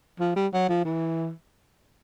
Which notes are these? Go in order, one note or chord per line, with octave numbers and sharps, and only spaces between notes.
F3
G3
F#3
F3
E3